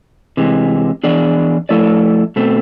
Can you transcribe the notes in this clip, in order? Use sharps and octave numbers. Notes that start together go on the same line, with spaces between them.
C3 E3 G#3
E3 B3 D4 G#4 D5
F3 A3 E4 A4 D5
B2 A3 C4